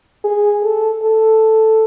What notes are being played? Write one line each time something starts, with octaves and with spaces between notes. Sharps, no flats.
G#4
A4
A4